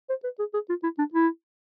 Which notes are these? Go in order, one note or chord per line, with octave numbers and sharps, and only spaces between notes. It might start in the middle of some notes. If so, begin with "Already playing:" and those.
C5
B4
G#4
G#4
F4
E4
D4
E4